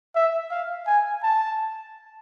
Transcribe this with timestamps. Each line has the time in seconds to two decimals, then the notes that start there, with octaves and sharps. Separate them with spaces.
0.15 E5
0.51 F5
0.87 G#5
1.23 A5